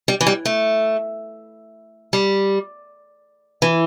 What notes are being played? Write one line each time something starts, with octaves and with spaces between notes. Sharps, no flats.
G3
E3
G3
A3
G3
E3